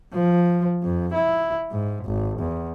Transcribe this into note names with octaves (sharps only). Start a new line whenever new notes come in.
F3
F2
E4
G#2
G#1
E2